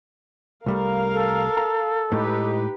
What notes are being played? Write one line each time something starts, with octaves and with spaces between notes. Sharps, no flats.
C2 G3 A3 A#4 F5
A4
A#5
A2 G#3 D#4 G4 B4